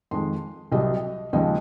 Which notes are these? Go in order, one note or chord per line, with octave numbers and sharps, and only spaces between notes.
F2 D#3 G#3 C6
C2 C3 F#3 D#5
D#2 C#3 F3 G#3 D#5